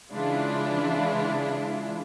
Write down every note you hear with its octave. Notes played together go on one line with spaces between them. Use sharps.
C#3 E3 G#3 D4 E4 F4